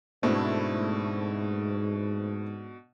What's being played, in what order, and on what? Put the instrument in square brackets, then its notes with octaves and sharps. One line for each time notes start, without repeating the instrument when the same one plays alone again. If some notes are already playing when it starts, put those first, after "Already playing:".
[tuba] G#2 [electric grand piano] B2 D4 [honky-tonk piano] A3 C4 E4